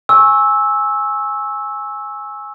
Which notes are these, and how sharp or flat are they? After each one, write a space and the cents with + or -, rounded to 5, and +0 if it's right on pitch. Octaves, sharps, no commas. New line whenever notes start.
G#5 +0 C#6 -25 E6 -10